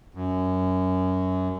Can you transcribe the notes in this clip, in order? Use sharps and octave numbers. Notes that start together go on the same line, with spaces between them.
F#2